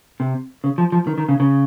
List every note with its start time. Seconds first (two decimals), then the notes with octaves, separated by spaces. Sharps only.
0.20 C3
0.64 C#3
0.78 F3
0.92 F3
1.07 D#3
1.18 D#3
1.29 C#3
1.40 C#3